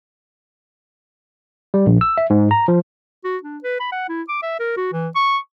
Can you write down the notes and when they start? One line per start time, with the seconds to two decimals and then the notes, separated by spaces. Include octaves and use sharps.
1.74 G3
1.86 A#1
2.01 E6
2.18 E5
2.30 G#2
2.51 A#5
2.68 F3
3.24 F#4
3.43 D4
3.63 B4
3.80 B5
3.92 F#5
4.09 E4
4.29 D6
4.42 E5
4.59 A#4
4.77 F#4
4.93 E3
5.15 C#6